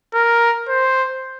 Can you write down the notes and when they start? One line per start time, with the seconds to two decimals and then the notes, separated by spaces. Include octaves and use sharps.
0.14 A#4
0.68 C5